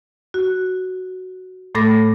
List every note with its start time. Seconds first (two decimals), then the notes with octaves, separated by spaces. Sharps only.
0.34 F#4
1.75 A2 A3 A4 B5 D6 A#6